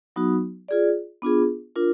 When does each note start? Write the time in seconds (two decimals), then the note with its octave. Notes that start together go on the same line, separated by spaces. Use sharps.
0.16 F#3 B3 D#4 F#4
0.69 F4 G#4 D5
1.22 B3 D4 F4 G#4
1.76 D4 F4 A#4